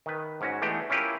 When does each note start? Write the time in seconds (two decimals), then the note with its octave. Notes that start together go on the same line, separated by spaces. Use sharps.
0.06 D#3 B4
0.41 G#2 C#4 F#4
0.62 E3 G#3 A3 B3 D4 G4
0.90 C#4 E4 F4 G4 A#4 B4